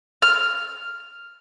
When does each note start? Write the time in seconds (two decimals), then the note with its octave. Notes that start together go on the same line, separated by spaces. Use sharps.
0.22 F6